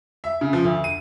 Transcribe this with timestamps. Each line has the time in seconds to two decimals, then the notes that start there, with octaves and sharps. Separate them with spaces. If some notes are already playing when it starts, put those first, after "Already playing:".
0.24 E5
0.41 C#3
0.53 F3
0.64 D2
0.84 D#7